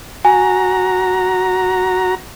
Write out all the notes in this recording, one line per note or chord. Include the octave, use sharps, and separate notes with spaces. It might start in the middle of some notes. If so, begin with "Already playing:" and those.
F#4 G#5 A#5